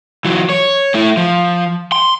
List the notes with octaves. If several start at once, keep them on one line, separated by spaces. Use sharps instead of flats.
E3 F#3
C#5
A3 E4
F3
C6